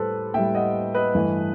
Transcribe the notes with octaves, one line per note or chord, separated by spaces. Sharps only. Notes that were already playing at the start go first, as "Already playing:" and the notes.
Already playing: A2 G3 G4 A4 B4 C5
A2 G3 E5 G5
D#5 F#5
B4 D#5
G2 E3 A3